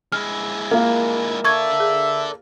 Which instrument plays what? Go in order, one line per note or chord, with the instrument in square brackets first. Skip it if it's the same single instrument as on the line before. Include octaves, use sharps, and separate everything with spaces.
[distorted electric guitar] G#3 E4 [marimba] F6
[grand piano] A#3 F4 F5 [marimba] A#4
[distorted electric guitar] A4 D5 [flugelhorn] E5 [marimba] C#6 G#6
[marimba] G#4